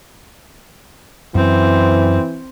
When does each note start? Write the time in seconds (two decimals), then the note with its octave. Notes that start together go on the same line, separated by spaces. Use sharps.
1.35 F#2 E3 C4